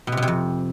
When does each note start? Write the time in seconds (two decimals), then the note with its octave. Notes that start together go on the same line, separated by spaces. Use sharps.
0.07 B2
0.12 C3
0.17 B2
0.22 C3
0.28 F2